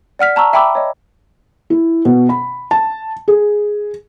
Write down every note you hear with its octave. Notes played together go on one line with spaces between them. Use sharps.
D5 F#5 F6 B6
A5 A#5 C#6 E6
E5 G5 A#5 B5 D6 E6
C#5 D#5
E4
B2
B5
A5
G#4